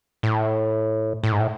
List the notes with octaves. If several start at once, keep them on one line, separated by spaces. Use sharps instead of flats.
A2
A2
G#2
A2